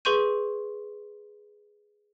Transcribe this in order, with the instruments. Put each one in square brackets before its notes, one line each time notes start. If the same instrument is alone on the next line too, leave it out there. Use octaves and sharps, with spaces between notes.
[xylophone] G#4 B4 C6 C#6 G6 D#7